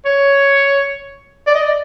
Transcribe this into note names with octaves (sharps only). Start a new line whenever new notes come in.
C#5
D5
D#5
D5